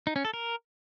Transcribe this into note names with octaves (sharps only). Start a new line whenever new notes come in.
D#4
C#4
A4
A#4